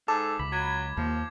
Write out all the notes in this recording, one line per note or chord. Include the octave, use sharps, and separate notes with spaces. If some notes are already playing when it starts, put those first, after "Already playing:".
G#2 A4 D6
C#2 B5
F#3 G#6
D#2 F3 A#3